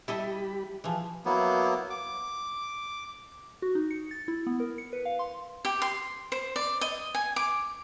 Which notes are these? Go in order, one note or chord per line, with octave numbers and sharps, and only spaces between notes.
G3 E4 G4 A4 D#5 B5
E3 F3 G#4
F#3 A#3 B3 E4
D6
F#4
D#4
C#7
A6
E4
B3
A#4
C#7
B4
F5
C6
G4
C6
C5
D5
D#5
G#5
D6